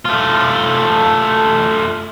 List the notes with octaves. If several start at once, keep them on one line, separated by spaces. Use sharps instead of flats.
A3 F4